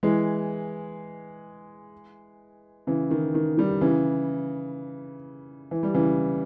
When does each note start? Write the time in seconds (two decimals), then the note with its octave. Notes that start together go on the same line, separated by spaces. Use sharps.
0.03 E3 G#3
2.87 C#3 E3
3.11 D#3
3.34 D#3
3.57 D#3 G3
3.81 C#3 E3
5.71 E3
5.83 G3
5.94 C#3 E3